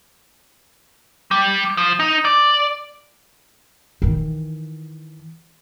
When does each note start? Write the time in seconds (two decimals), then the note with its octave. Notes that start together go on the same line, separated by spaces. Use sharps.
1.31 G3
1.77 F3
2.00 D#4
2.25 D5
4.02 D#3 E3